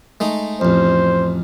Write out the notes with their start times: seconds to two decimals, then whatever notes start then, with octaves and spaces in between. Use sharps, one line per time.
0.20 G#3 A3 D#4
0.61 A1 F2 C5